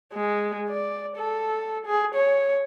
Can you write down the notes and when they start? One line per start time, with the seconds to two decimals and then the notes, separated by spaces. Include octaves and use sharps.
0.13 G#3
0.69 D5
1.17 A4
1.86 G#4
2.15 C#5